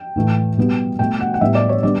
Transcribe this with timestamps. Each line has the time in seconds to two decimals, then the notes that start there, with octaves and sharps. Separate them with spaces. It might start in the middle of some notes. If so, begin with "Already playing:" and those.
Already playing: G5
0.16 A2 E3 A3
0.57 B2 G3 B3
0.99 B2 A3 G5
1.20 F#5
1.34 F#5
1.41 A2 G3 B3 E5
1.55 D5
1.69 C#5
1.83 D3 G3 B3 D5